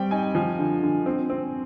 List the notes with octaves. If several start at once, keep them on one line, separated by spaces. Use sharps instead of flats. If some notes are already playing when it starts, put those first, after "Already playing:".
Already playing: G3 C4 G5
D#4 G#5
F3
D3
D3
C4
C4